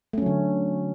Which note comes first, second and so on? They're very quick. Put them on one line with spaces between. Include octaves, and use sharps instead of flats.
A3 C#4 F#3 D3